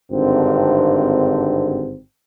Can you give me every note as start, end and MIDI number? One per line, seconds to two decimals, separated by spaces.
0.11 1.97 32
0.11 1.97 43
0.11 1.97 50
0.11 1.97 60